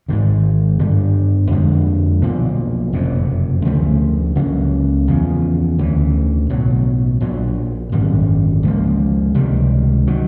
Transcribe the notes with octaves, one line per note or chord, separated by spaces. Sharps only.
G#1 G#2 D#3
G1 G2 D3 G3
F2 D3 F3 G#3
B1 A#2 F3 A#3
F#1 F2 C3
D2 C#3 F3 A3
C#2 C#3 F#3 A#3
E2 C#3 F3
D2 C#3 E3
B1 A2 F#3
A#1 A#2 F#3
G#1 F#2 D3 G3
C#2 C#3 F3 A#3
C#2 C3 D#3 G3
D#3 F#3